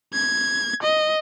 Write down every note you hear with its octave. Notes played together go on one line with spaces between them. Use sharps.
G#6
D#5